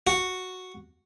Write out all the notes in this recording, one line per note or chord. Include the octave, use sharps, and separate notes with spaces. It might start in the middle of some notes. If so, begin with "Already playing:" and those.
F#4